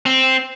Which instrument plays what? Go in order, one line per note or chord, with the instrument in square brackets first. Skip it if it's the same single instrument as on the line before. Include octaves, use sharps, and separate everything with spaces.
[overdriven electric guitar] C4